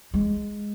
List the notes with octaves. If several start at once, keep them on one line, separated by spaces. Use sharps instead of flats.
G#3